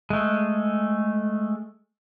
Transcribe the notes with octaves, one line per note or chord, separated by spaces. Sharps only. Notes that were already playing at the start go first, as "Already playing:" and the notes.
G#3 A3